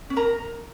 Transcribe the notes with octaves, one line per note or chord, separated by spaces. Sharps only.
C#4
A#4 A#5